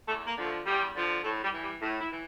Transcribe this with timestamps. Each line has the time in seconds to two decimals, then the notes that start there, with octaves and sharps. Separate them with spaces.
0.07 E2 A3
0.27 A#3
0.37 D3 F3
0.46 A3
0.65 E2 G3
0.95 D3 F3
1.24 A2 A3
1.43 G3
1.53 E3
1.63 G3
1.81 A2
2.01 E4
2.11 E3